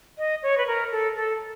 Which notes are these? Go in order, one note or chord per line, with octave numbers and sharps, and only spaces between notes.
D#5
C#5
B4
A#4
A4
A4